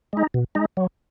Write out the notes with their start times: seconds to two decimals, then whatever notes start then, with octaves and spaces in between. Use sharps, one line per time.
0.13 G#3 D#4
0.34 B2
0.55 G#3 D#4
0.77 F#3